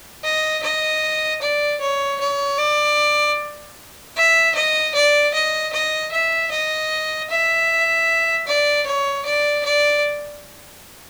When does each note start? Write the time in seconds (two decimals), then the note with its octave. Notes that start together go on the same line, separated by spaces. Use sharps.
0.24 D#5
0.63 D#5
1.41 D5
1.80 C#5
2.20 C#5
2.58 D5
4.16 E5
4.55 D#5
4.95 D5
5.34 D#5
5.73 D#5
6.12 E5
6.51 D#5
7.30 E5
8.47 D5
8.86 C#5
9.25 D5
9.65 D5